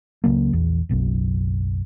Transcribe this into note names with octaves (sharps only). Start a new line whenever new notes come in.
C#2 C#3 F#3 A#3
A#1 E2
F#1 B1 F#2